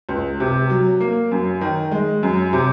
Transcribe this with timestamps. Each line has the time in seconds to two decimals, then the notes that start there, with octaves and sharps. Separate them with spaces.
0.09 C#2
0.40 C3
0.70 F#3
1.00 A#3
1.31 F#2
1.61 D#3
1.92 G#3
2.23 F#2
2.53 C3